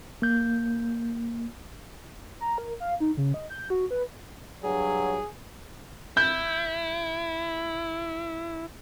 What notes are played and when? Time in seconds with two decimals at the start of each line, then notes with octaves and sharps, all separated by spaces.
0.22 A#3 G6
2.41 A#5
2.58 A#4
2.80 F5
3.00 D#4
3.17 C#3
3.34 D#5
3.50 G6
3.70 F#4
3.91 B4
4.63 G2 F#3 G#4
6.17 E4 G6